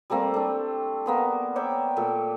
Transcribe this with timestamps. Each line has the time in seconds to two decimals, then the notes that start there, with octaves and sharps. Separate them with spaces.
0.10 G3 A3 A#3 C4
0.34 A3 D4
1.06 A#3 B3 C6
1.56 C#5 D5 E5 G5
1.97 A#2 A3